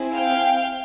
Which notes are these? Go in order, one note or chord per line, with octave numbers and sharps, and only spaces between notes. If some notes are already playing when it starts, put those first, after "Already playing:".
Already playing: C4 E4 G#4
F5 G5